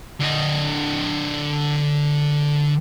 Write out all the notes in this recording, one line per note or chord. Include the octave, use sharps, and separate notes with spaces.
D3 D#5